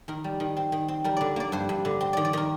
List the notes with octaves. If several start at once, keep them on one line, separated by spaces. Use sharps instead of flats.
D#3 A#4
G3
D#3
C4
D#3
C4
G3 A#4
D3 D5
A#3 D5
G2 C5
G2
D3
C4
D#3 D5
D5
D#3 A#4